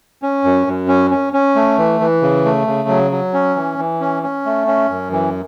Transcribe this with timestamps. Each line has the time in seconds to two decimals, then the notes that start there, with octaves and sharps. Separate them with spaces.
0.22 C#4
0.44 F#2
0.67 F#2
0.88 C#4
1.11 C#4
1.33 C#4
1.55 A3
1.78 E3
2.00 E3
2.22 C#3
2.45 A3
2.67 C#3
2.89 F#3
3.12 F#3
3.34 C#4
3.56 E3
3.78 E3
4.00 C#4
4.23 C#4
4.45 A3
4.67 C#4
4.90 F#2
5.12 E3